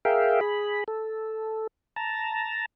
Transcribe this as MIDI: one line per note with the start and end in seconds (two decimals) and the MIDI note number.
0.05 0.40 68
0.05 0.40 70
0.05 0.40 76
0.05 0.40 77
0.05 0.40 79
0.41 0.84 68
0.41 0.84 83
0.88 1.67 69
1.96 2.66 81
1.96 2.66 82